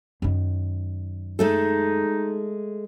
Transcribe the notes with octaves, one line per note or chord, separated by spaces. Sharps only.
F#2 D#3
G#3 A3 D#4 A4